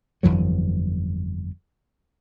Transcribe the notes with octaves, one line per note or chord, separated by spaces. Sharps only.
G1 F2 E3 F#3